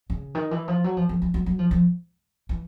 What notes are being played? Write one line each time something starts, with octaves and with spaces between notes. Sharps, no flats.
C#3
D#3
E3
F3
F#3
F3
F3
F3
F#3
F#3
F3
F3
E3